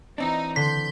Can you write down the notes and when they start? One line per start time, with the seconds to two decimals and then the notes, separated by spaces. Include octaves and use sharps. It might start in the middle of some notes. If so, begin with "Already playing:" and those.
0.18 E3 C4 D4 D#4
0.56 D3 C6 G6 B6